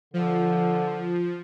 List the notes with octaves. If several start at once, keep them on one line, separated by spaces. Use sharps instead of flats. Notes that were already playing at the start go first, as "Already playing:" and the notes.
D3 F3